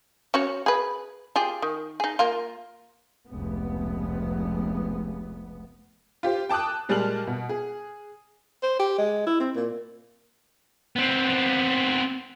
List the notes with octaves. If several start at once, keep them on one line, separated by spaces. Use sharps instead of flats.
C#4 F#4 C#5
G#4 B4
F4 G4 G#4
D#3
D#4 G#4
A#3 F4
F1 C#2 B3
F4 G4 C5
G5 A5 D6 D#6 F#6
A#2 G3 G#3 A5 F6 F#7
B2
G#4
C5
G4
G#3
E4
C4
A#2
B3 C4